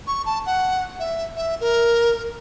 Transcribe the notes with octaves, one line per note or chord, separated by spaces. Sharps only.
C#6
A5
F#5
E5
E5
A#4